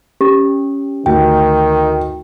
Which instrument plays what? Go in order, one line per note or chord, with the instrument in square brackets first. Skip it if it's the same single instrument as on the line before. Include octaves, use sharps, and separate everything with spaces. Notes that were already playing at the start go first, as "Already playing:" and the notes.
[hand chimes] C#4 [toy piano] G4
[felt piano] D2 [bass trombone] D#3 [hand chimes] G5